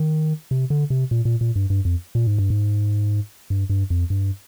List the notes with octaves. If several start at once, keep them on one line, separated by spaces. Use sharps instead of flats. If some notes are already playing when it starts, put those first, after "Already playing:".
Already playing: D#3
C3
D3
C3
A#2
A#2
A#2
G2
G2
F2
A#2
G#2
G2
G#2
G2
G2
F2
G2